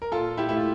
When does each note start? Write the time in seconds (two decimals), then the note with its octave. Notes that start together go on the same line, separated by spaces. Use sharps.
0.02 A#4
0.12 A#2 F4 A4
0.37 E4 G4
0.49 A3 E4
0.57 F4